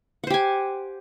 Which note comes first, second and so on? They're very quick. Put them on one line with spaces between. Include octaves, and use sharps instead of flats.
F#5 C5 G4 G#5